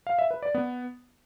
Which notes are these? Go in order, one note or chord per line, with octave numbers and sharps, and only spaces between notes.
F5
E5
B4
D5
B3